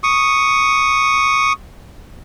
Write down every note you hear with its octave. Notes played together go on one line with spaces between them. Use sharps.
C#6 D#6